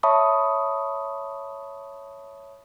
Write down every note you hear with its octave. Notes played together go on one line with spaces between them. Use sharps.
C#5 E5 A5 B5 C#6 D#6